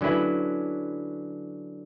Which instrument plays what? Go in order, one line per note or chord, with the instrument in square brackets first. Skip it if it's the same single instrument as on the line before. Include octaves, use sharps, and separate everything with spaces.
[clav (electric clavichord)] D3 F#3 C#4 E4 B4